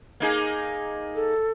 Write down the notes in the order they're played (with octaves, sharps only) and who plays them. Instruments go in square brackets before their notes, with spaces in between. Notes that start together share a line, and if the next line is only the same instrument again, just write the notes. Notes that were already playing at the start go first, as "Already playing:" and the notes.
[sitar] A#3 D#4 G#4
[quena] A4